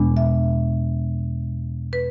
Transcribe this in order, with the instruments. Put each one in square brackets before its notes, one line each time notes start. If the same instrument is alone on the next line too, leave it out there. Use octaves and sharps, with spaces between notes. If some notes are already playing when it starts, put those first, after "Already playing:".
Already playing: [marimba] E2 B2 G#3 B3 D4
E5
B4